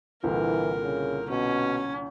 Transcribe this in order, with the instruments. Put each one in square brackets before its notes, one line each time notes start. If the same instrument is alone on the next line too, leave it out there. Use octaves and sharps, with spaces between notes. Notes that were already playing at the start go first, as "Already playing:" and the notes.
[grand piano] C2 A#2 D3 [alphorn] E3 [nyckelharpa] A#4
[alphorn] C#3
[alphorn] B2 [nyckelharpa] C#4